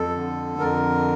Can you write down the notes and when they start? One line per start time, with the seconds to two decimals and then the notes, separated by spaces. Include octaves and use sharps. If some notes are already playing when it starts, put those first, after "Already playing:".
Already playing: F2 A4
0.16 D3
0.59 F2 A#4